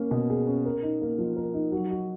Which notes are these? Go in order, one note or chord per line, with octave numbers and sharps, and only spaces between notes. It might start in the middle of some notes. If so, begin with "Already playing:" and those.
Already playing: A#3 C#4
B2
G#4
C#4
A#4
D#4
A#3
F3
A#4
D#4
F#3
F#4